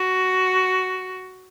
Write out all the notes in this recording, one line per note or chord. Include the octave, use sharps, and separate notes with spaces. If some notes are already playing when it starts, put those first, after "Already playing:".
Already playing: F#4